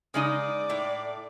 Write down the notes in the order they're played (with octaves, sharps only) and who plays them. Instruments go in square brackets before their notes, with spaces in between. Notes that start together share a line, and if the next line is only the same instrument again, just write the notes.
[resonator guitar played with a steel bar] C#3 G#3 D#4 [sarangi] D5
[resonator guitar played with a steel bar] A2